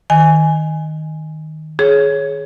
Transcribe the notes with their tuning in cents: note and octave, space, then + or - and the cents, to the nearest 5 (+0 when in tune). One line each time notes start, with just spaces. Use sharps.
D#3 +0 G#5 +0
G#4 +20 C#5 +0